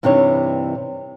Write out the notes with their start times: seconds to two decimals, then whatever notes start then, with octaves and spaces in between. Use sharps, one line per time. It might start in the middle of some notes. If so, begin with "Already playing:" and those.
0.03 G2 C3 E3 D4 D#4 C#5